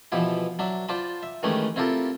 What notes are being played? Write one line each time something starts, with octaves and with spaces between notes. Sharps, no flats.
B2 E3 F3 E4 G4
F#3 D4 E5
F4 C5 D5 A5 B5
E5
D#3 E3 G#3 A3 C#4 G4
C4 E4 F4 G4 A4 A#4